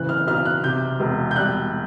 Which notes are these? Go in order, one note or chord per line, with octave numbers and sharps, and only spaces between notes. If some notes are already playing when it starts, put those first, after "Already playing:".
Already playing: F#1 C#3 E3 F#6
F6
B1 F6
F#6
C3 G6
E1
G6
G3 F#6